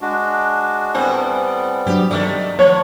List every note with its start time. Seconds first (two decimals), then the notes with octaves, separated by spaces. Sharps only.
0.01 G#3 D4 F#4
0.95 A2 G3 B3 C4 C5 G#5
1.86 G2 F#3 D4 G4
2.11 C3 D#3 A3 D5
2.59 F3 B3 C#5